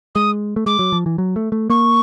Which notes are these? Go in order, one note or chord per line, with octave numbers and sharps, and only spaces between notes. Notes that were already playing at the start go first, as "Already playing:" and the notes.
G#3 D#6
A3
G#3 D6
F#3
F3
E3
F#3
A3
A3
A#3 C#6